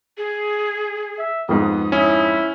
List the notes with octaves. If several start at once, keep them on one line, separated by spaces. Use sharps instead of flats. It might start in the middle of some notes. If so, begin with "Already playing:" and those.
G#4
E5
F2 G#2 B3 D#6
C#4 E4